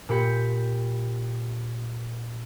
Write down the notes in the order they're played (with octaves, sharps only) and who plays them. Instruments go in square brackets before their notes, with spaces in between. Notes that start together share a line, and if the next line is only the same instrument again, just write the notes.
[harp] A#2 G4 B5 C#7